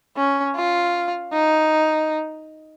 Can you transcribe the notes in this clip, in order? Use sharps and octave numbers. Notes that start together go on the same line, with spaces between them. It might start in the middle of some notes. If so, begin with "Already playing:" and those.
C#4
F4
D#4